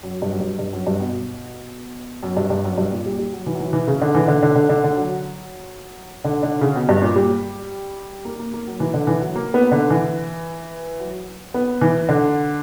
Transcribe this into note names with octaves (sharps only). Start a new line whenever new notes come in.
F#2
G2
F#2
G2
G2
F#2
G2
B2
F#2
G2
G2
F#2
G2
A#2
G3
G3
F#3
E3
F#3
E3
E3
C#3
D3
E3
D3
D3
D3
D3
D3
F#3
D3
D3
C#3
B2
G2
A#2
G3
A#3
A#3
A#3
F#3
E3
D3
E3
F#3
A#3
B3
D3
E3
F#3
B3
E3
D3